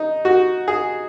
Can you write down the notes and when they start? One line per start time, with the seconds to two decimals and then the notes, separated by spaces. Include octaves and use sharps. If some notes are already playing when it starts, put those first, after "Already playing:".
Already playing: D#4
0.25 F#4
0.68 G#4